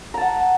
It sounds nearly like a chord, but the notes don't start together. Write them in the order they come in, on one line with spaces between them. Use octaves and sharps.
A#5 A5 F#5